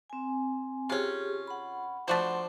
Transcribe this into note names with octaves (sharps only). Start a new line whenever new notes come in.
C4 G#5
C3 C#4 F4 G4 G#4
F#5 B5
F3 A3 D4 F#4 C5